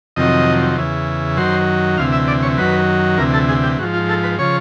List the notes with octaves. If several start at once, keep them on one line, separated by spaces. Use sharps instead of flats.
F2 C3 D#3 F#3 D#5
E2 C#3 E3
F#2 D#3 F#3 C5
D2 C3 E3 F5
E5
D5
C#5
F#2 D#3 F#3 B4
D2 C3 E3 A#4
A4
G#4
G4
G#2 F3 F#4
F4
A4
B4
C#3 F3 C#5